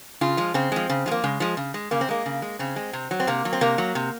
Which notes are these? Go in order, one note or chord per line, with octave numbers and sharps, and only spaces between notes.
C#3 F4
F3 G#3
C#3 C4
F3 G#3
C#3
F3 G#3
A#3
C#3 G#3
F3 G#3
C#3
G#3
C#3 A#3
C4
G#3 A#3
C#3
G#3
C#3 C4
G#3
C3
F#3
C4
C3 A#3
F#3
C4
C3 A#3
F#3
C3